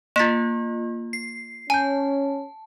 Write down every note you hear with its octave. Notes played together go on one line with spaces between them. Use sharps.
A#3 F4 A6 B6 E7
C7
C#4 G#5 A5 G6